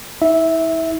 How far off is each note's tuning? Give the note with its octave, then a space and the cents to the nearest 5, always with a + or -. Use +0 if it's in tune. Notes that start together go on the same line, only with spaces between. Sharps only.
E4 -40 E5 -10